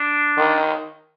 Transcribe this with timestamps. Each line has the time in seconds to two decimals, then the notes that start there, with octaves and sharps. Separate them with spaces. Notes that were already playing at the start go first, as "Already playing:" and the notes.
Already playing: D4
0.37 D#3